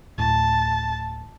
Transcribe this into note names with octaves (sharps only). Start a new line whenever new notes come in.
D1 A2 A5